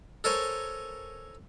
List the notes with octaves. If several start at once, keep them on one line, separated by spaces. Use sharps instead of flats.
A4 A#4 C5 C#5 G#5